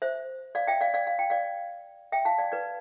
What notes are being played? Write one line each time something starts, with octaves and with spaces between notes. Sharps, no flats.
C5 E5
D5 F5
E5 G5
D5 F5
D5 F5
F5
G5
D5 F5
E5 G5
F5 A5
D5 F5
B4 D5